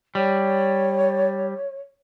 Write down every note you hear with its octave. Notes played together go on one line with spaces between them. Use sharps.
G3 C#5